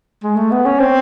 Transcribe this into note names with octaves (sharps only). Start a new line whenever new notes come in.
G#3
A3
B3
C#4
C4